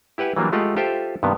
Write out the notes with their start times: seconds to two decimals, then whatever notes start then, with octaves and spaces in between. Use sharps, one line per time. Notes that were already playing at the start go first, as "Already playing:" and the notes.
0.18 E4 G4 B4 F#5 G#5
0.36 E3 F#3 G3 A#3 D4
0.52 G#3 A3 F4 G4 D#5 F#5
0.76 F4 G4 A4 C5 E5 G5
1.23 G2 C3 D#3 B3